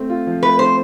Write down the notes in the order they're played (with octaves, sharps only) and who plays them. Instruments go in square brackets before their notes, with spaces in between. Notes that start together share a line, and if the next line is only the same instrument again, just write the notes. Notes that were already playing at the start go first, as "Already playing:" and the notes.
Already playing: [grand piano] A3 C4
F4
F3
[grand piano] A3 [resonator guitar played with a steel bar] B4
[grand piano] C4 [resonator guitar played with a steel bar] C5